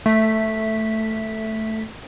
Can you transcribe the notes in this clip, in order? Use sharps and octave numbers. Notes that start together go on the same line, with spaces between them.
A3 B6